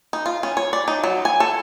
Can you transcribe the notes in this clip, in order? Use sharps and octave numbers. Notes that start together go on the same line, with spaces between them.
D#4
F4
C#4
C#5
D5
D#4
F#3
G#5
A4